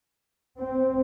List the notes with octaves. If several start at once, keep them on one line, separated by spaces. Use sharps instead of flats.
C4